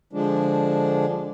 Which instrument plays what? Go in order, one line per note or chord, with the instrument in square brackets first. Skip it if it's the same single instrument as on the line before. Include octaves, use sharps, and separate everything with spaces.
[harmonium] D3 F3 G#3 D4